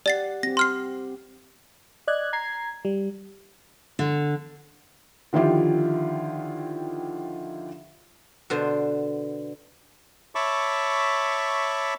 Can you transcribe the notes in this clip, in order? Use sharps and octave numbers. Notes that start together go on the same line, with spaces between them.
G4 D5 F#5 A6 C7
C4 G4 A#6
C6 F6 C7
D5 D#5 F#6 G#6
A#5 G#6 C7
G3
D3
D3 D#3 F3 E4 F4 G4
B2 D3 C5
C#5 E5 A5 B5 C#6 D6